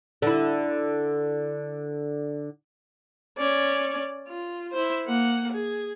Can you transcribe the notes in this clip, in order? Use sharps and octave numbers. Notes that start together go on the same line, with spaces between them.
D3 E4
C#4 D5
F4
E4 C5
A#3 F#5
G#4